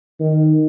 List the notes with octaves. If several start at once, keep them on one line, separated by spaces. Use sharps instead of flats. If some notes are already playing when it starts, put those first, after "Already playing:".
D#3